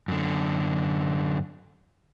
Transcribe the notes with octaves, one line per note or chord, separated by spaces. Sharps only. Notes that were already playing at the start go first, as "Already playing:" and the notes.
F#2 D3